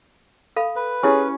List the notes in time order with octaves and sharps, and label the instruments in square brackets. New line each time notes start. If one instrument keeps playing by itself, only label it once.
[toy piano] A4 F5 B5
[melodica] B4
[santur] C#4 [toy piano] E4 G4 [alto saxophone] G#4